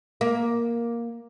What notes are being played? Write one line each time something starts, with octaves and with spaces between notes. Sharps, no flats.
A#3